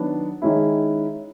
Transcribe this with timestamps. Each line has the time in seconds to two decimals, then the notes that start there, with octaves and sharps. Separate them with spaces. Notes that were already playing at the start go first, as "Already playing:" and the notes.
Already playing: D#3 F#3 B3 D4
0.42 D#3 G#3 C#4 E4